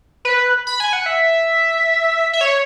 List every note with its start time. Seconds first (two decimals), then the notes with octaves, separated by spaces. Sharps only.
0.25 B4
0.67 B5
0.80 G#5
0.93 F#5
1.06 E5
2.33 E5
2.41 C#5